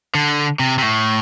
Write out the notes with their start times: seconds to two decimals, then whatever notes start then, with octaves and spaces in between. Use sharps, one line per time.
0.15 D3
0.60 C3
0.78 C3
0.82 A2